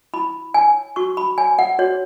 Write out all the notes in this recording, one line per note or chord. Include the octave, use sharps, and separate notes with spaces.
E4 B5
C#5 G#5
F#4 C#6
B5
C#5 G#5
F#5
F#4 C#5